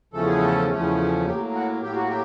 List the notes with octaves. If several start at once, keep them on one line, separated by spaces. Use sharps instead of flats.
E2 C#3 F3 A3 C#4 A4
G#4
A4
E2 C#3 F3 A3 C#4
A2 F#3 A#3 G4
F#4
A2 F#3 A#3 G4
F#4
G4